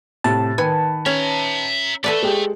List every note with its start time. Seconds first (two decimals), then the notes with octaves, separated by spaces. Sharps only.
0.24 A2 C3 A5
0.58 D#3 B4 G#5 C#7
1.06 C#4 E5 A#5
2.04 A3 A4 B4 D5
2.23 G#3 G4